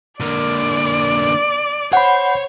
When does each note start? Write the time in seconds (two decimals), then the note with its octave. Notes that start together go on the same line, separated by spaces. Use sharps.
0.21 D3 A#3 D5
1.93 C5 C#5 F#5 B5